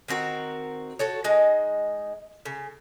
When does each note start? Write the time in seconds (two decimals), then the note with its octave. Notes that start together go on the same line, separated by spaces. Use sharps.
0.08 D#3 C4 F#4 A#4
0.99 F#4 A4 C#5
1.24 G#3 D#4
2.45 C#3